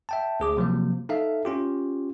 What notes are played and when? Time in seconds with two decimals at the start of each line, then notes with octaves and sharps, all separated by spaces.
0.09 E5 G5 A5
0.40 D2 G#4 D6
0.57 C3 F3 F#3 A#3
1.09 D#4 A4 E5 F5
1.45 C#4 F4 G4